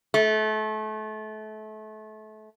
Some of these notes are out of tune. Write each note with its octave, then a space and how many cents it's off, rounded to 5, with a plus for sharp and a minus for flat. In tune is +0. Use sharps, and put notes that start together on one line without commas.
A3 -30